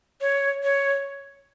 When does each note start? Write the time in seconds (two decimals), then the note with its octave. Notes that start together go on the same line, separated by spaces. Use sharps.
0.21 C#5
0.63 C#5